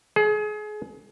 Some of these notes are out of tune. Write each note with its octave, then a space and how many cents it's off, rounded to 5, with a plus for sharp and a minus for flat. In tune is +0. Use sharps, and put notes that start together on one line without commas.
G#4 +30